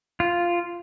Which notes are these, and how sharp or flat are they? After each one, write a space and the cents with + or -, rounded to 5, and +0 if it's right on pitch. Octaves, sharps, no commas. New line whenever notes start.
F4 -5